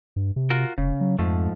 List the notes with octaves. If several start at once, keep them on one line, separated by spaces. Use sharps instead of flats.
G2
C3
F4 F#4 A#4
F1 C#3
F#3
F2 G#2 F3 A3